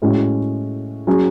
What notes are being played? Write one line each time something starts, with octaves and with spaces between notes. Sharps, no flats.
A2 G#3 C#4 F#4
F#3 C#4 G#4